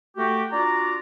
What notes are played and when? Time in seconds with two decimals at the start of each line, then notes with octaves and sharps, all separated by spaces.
0.17 A3 F#4 G4
0.51 D4 F4 F#4 D5 A#5